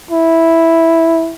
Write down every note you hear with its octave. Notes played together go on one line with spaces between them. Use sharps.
E4